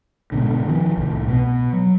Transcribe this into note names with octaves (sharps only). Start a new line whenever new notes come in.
G#2 B2 D3
D#3 F3
C2 A2
B2 B3
F#3